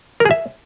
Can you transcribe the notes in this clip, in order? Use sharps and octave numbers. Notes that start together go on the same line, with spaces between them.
A#4
G#4
E5